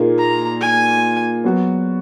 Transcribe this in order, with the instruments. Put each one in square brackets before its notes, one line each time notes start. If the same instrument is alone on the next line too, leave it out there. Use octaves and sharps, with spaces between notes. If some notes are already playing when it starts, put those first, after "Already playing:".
Already playing: [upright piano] A#2 A#3 D#4 G#4
[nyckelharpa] A#5
G#5
[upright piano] F#3 B3 F#4